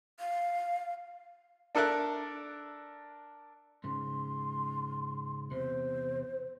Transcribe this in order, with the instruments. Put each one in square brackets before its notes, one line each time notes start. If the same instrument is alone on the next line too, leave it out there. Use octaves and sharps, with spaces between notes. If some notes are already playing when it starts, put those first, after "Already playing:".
[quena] F5
[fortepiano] D4 A4 A#4 E5 F#6
[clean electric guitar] G#2 C#3 [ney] C6
[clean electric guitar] E2 C3 [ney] C5